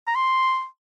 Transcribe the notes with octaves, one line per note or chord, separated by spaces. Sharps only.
A#5
C6